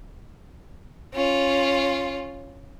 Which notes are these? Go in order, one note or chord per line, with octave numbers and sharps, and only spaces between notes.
C#4 F4